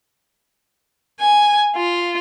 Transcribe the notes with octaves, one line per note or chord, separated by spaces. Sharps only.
G#5
F4